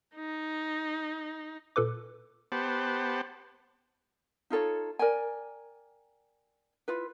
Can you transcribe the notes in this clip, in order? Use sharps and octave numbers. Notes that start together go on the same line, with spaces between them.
D#4
A#2 A4 B4 D6
B3 G4 C5 F#5 A5
D#4 F4 A4 C#5
A#4 D5 G5 G#5
E4 F4 B4